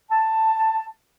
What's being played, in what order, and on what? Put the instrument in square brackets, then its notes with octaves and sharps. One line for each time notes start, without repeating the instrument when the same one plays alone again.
[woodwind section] A5